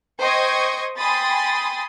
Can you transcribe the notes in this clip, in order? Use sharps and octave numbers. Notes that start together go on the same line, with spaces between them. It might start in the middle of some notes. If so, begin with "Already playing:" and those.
C5 D#5 G5 C#6 D#6 G#6
G5 G#5 B5 C6 D#6 A6